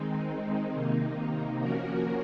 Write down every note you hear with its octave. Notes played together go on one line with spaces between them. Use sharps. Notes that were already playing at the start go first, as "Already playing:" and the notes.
Already playing: D#3 G#3 C4 D#4
C3 D#3 A#3 D#4
F3 A#3 C#4 F#4 A#4